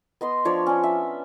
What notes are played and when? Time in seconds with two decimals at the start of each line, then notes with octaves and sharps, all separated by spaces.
0.21 B3 D#5 C6
0.45 F3 D4 C#5 D5
0.66 C#4 D4
0.83 E5